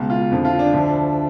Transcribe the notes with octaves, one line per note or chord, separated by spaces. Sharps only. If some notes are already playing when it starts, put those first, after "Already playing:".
Already playing: C#2 B2
F4
F2 D3 F3
F4
D4
D2 D3 F3